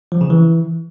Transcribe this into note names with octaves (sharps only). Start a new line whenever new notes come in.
F3
C#3
E3